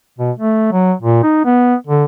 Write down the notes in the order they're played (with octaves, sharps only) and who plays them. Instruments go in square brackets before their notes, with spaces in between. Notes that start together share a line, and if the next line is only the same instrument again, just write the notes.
[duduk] B2
A3
F#3
A#2
D#4
B3
D3